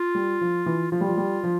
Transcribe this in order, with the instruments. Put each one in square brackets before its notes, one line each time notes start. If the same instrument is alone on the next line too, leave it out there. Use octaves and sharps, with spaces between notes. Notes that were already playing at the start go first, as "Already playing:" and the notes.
Already playing: [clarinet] F4
[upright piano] G3
F3
E3
[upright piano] F3 [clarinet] F4
[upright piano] G3
F3
G3
F3